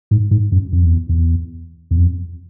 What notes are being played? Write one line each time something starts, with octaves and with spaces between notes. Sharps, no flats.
G#2
G#2
F#2
F2
E2
E2
E2
F2